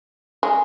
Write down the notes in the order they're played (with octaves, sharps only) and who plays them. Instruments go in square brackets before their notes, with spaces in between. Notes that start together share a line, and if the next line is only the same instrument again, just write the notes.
[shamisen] G#3